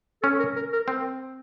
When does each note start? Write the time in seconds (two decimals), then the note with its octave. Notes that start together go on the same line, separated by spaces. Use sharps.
0.22 C#4 A4
0.39 A#4
0.56 A#4
0.73 A#4
0.88 C4